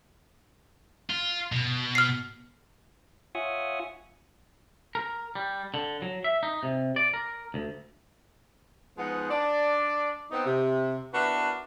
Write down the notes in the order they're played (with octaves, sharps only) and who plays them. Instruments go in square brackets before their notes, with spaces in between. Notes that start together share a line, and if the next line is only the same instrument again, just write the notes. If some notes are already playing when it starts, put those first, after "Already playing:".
[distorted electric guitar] F4
B2
[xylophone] F6 C7
[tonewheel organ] F4 C#5 E5 F#5 G#5 D#6
[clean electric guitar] A#4
G3
D3
F#3
E5
D#4
C3
D5
A#4
D2
[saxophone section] F3 G#3 B3 D#4 F#5
D4 D5
B3 C4 D#4
C3
B3 D4 E4 F#4 A#4 B4